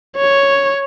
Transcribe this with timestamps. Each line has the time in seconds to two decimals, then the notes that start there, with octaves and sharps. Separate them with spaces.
0.17 C#5